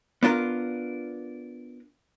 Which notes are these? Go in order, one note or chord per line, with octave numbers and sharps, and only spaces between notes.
B3 D4 F4 A#4